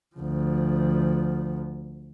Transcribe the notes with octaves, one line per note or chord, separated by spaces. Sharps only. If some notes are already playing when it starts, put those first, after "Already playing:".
D2 F3